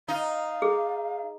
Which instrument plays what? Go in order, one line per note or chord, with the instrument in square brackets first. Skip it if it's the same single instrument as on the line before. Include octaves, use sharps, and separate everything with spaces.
[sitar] D#4 [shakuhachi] F5
[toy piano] G#4